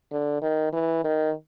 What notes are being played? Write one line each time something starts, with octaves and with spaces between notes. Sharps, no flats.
D3
D#3
E3
D#3